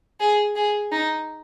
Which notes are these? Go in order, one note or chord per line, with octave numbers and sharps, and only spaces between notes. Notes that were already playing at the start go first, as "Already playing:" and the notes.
G#4
G#4
D#4